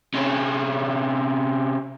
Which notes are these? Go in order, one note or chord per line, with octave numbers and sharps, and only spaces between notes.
C3 C#4